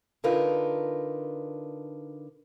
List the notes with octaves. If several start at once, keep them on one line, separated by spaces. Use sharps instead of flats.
D3 D#4 F4 A#4 B4